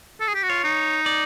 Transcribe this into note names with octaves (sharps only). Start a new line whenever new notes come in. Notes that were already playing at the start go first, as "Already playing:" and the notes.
A4
G#4
G4
F#4
F4 C#5
D#4
D5